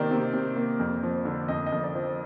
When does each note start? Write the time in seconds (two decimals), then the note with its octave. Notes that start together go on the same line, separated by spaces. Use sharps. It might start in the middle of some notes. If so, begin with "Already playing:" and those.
Already playing: C3 D#3 A#3 A#4 C5 D5
0.11 C3
0.33 C3
0.56 A#3
0.80 F2
1.03 F3
1.25 D3
1.48 F2 D#5
1.66 D#5
1.72 F2
1.84 D5
1.95 F3